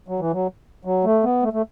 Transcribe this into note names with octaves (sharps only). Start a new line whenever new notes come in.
F#3
E3
F#3
F#3
A3
B3
A3
A3